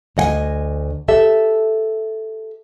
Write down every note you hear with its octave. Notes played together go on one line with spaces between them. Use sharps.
D2 D#5 F#5 G#5
G4 A4 E5